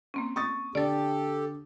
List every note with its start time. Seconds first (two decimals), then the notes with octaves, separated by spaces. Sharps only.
0.14 A#3 C4 C#4
0.36 C#6 D#6 A6
0.75 D3 G4 A4 D5 A6